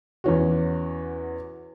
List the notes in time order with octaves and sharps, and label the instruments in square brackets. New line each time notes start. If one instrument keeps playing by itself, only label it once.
[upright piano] E2 E3 C#4 F#4